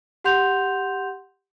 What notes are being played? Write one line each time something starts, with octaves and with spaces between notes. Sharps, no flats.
G4 F#5 C6 G6 F7